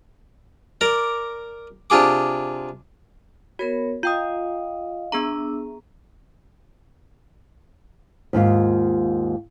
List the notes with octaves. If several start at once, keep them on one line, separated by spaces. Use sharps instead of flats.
A#4 D5 A#5 D6
C3 D4 F4 G#4 D6
B3 F#4 A#4 C#5
F4 D#5 F5 G5 D#6
B3 D4 G#4 A#5 E6
D#2 G#2 F4